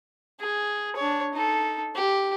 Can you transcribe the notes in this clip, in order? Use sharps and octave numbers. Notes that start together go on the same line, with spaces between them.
G#4
D4 C#5
D#4 A4
G4